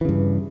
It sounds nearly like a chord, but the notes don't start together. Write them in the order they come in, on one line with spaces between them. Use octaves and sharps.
E3 C#3 G2